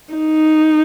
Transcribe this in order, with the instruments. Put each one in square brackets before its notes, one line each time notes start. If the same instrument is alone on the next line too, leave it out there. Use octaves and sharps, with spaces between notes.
[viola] D#4